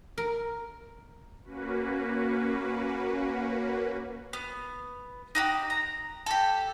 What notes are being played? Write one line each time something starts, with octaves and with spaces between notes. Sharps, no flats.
A#4
A#3 C#4 F#4 B4
B3
D#4 F#4 G4
A#5
G4 A4